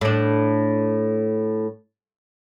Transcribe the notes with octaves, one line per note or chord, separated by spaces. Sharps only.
A2 D4